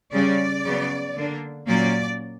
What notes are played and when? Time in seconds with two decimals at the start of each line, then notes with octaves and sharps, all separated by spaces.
0.12 C#3 G3 C#4 D5
0.64 C#3 F#3 B3
1.16 D3 A#3 D4
1.67 A#2 F#3 A#3 C#4 D5